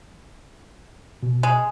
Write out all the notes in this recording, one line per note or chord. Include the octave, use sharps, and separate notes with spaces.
B2
G#3